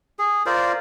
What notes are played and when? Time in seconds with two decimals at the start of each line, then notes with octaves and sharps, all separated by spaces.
0.19 G#4
0.46 F4 A#4 C5 D5